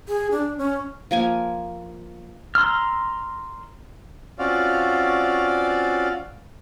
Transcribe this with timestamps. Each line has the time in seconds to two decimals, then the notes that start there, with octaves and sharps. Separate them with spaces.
0.08 G#4
0.32 D4
0.58 C#4
1.11 F3 A#3 G#5
2.55 A#5 C6 E6 F6
4.39 C4 C#4 F4 F#4 D5 F5